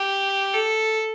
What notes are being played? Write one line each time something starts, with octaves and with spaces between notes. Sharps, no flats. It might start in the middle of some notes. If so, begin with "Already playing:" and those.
Already playing: G4
A4